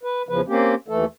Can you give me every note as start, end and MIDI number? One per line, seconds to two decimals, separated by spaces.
0.03 0.22 71
0.29 0.41 40
0.29 0.41 49
0.29 0.41 53
0.29 0.41 71
0.48 0.75 58
0.48 0.75 60
0.48 0.75 61
0.48 0.75 67
0.88 1.05 39
0.88 1.05 52
0.88 1.05 57
0.88 1.05 69